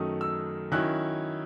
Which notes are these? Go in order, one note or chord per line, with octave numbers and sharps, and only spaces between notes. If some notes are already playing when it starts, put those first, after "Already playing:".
Already playing: F#2 D#3 F#3 A3 D#6
E6
D#3 F#3 C#4 E4 F#6